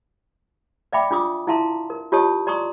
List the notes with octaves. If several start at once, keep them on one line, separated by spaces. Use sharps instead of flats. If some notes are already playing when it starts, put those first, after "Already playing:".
D5 E5 F5 G5 B5 D6
D4 F4 D6 D#6
E4 E5 F5 A5 A#5 C6
A#4
F4 G4 C#5 D#5 A5 D#6
D5 A#5 C6 C#6 D#6